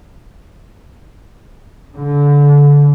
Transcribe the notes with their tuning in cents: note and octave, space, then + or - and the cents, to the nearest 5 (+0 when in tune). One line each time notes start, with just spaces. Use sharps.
D3 -25